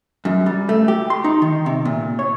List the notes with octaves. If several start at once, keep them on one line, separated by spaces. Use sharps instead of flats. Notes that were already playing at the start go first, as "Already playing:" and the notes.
F#2
G3
A3
G4
C6
D#4
D#3
C3
A#2
C#5